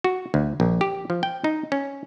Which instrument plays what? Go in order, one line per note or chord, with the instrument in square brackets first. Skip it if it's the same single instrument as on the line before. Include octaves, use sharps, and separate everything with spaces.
[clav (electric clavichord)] F#4
D2
A#1
G4
F3
G5
D#4
C#4